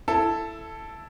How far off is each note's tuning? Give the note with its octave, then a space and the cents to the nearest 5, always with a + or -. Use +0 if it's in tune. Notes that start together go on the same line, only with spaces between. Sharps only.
E4 +15 A4 +0